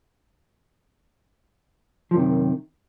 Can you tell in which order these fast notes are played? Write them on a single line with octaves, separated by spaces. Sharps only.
F3 F#2 C3 D#3